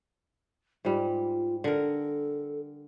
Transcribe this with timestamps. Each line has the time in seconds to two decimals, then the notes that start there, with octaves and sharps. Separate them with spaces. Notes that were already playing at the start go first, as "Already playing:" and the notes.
0.85 G#2 G3 F4
1.64 D3 A4 A#4